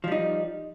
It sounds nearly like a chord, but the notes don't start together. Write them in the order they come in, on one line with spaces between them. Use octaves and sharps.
F3 G3 D#4